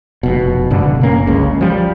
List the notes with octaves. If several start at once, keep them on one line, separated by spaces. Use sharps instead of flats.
F1 B2
F#1 G2 B2 D3
F#1 A#3 C#4
G1 C#2 C#3
F3 G3